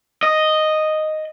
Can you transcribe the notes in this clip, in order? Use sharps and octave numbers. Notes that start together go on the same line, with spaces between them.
D#5